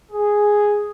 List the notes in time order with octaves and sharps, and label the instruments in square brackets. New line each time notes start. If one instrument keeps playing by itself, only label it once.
[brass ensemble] G#4